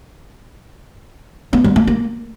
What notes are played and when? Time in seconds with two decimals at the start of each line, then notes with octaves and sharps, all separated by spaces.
1.53 B3
1.64 G3
1.76 A#3
1.87 A#3